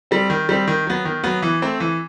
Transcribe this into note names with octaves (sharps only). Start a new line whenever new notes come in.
G3 C4
D#3
G3 C4
D#3
F#3 B3
D#3
F#3 B3
E3
A3 C4
E3